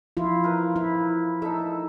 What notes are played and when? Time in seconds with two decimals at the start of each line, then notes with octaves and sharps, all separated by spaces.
0.17 F3 E4 F4
0.44 A#4 B4
0.76 E4
1.42 D#4 A4 E5